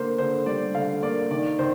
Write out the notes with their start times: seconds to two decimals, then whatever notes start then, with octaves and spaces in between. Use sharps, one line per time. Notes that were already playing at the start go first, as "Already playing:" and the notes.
Already playing: D3 A#3 C5
0.18 D3 C5
0.46 G3 D5
0.74 D3 F5
1.03 A#3 D5
1.31 D#3 D5
1.59 D#3 C5